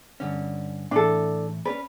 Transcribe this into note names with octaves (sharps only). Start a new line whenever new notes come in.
G2 D3 C#4
A2 E3 D4 A4
C#4 B4 D5